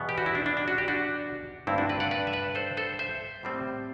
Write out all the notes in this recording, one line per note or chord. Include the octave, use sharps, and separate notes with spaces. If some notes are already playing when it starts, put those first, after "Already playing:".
Already playing: E2 B2 G3 B3
G4
F#4
E4
D4
D4
D4
F#4
G4
D4 F#4
G2 D3 A3 C4 E4
D4 F#4
B4 D5
D5 F#5
B4 D5
E5
B4 D5
A4 C5
A4 C5
C5 E5
A2 G3 C4